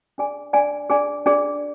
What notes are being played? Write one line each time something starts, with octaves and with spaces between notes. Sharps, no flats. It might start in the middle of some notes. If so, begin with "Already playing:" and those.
D4 G#4 D5 G#5
D4 G#4 D5 G#5
D4 G#4 D5 G#5
D4 G#4 D5